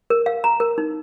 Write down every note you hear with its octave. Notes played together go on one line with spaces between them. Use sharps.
A#4
F5
A#5
A#4
D#4